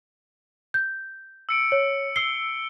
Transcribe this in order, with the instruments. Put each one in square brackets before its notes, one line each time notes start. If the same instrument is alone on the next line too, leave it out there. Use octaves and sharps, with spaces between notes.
[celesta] G6
[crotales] E6 C#7 D7
[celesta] C#5
[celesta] E6 C7 [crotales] G7